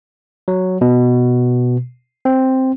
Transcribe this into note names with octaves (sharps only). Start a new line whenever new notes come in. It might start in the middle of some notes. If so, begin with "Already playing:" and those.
F#3
B2
C4